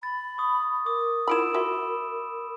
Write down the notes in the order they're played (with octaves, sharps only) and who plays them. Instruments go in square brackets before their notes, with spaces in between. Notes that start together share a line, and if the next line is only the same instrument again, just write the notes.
[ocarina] B5 [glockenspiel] A6
[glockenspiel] C#6 D#6
[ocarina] A#4 [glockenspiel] D6 D#6
[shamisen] E4 F4 B5 [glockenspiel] E6 D7 E7
[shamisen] F#4 E5 [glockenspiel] B5 C6